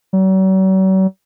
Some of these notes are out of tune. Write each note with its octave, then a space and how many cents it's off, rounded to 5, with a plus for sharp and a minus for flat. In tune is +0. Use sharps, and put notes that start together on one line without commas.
F#3 +45